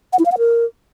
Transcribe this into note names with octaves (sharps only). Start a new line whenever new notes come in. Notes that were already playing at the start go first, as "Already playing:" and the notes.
F#5
E4
F5
F#5
A#4